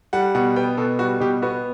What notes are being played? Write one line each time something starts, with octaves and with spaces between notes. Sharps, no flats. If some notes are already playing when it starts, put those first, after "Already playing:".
G3 F#5
B2 F#5
B3 G5
B2 A4
G3 F#4
B2 G4
B3 F#4